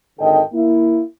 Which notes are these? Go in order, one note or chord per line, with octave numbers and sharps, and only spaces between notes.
G#1 D3 D#3 A4 D#5 G5
A#3 E4